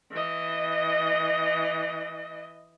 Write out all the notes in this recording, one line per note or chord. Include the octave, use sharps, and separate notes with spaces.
E3 D#5